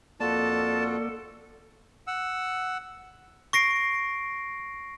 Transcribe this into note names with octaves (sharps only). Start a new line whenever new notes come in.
F2 A#3 F4 F#4 A4 D5 A5
F#5 E6
C#6 A#6 C7 D7